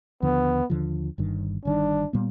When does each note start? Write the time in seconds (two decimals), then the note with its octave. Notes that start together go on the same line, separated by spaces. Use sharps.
0.22 D#2 D3 F3 B3
0.70 D#2 D3 F3
1.18 G1 G2 D#3
1.65 G1 G2 D#3 D4
2.13 A#2 G3 B3